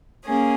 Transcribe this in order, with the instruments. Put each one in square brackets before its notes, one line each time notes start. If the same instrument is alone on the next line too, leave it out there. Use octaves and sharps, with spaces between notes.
[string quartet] A#3 C#4 G#4